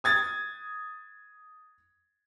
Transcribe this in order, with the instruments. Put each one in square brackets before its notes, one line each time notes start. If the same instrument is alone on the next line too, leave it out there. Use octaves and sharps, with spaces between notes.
[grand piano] D#6 G#6 A6